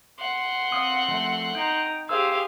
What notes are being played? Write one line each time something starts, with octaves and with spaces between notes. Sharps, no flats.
F#5 C6
C4 F5 D#6
F3 A3
D#4 G5 A#5
G4 G#4 C5 F5 E6